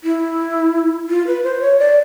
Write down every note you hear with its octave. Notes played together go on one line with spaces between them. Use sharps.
E4
F4
B4
C5
C#5
D5